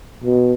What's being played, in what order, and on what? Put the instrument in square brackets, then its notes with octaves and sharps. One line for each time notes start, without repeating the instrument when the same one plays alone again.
[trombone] B2